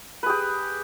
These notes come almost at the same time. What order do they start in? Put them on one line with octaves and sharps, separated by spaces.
B4 G#4 G4